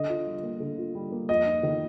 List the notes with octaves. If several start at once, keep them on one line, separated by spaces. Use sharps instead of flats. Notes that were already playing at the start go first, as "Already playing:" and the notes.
Already playing: D3 D#5
F4
G3
A#3
D3
F4
G3
A#3
F2 D#5
D#4
D#3